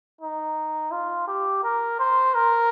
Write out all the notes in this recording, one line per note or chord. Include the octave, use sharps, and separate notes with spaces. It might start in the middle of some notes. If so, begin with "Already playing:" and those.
D#4
F4
G4
A#4
C5
A#4